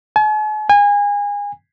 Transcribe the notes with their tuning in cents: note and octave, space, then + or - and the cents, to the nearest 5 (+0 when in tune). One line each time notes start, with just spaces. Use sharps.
G#5 +45
G#5 -30